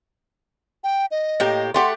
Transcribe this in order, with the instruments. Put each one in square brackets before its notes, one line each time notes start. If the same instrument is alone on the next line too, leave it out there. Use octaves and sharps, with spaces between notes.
[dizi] G5
D#5
[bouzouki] A2 A#3 G4
[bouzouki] A3 G4 F#5 [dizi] C6